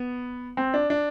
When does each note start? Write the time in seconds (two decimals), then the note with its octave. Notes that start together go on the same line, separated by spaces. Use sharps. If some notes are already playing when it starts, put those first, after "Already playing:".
Already playing: B3
0.57 C4
0.74 D4
0.90 D4